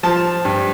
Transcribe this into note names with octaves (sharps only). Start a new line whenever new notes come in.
F3 A5
G2